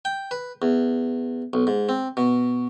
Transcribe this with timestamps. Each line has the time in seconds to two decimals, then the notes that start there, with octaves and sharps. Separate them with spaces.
0.05 G5
0.31 B4
0.62 E2
1.53 B1
1.67 G#2
1.89 C4
2.17 B2